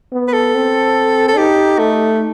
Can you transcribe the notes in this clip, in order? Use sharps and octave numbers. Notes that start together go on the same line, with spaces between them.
B3
B4
A4
C4
A4
D#4 G4
A3